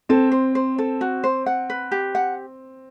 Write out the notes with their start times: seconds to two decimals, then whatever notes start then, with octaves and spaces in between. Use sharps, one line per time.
0.09 C4 A4
0.32 C5
0.55 C5
0.78 A4
1.01 F#4
1.24 C5
1.46 F#5
1.70 B4
1.91 G4
2.15 F#5